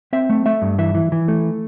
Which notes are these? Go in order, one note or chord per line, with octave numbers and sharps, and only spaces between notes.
C4 E5
A3
A3 E5
G2
E3 E5
E3
E3
A3